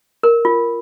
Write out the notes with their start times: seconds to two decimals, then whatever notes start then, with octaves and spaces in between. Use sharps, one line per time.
0.23 A#4
0.45 F4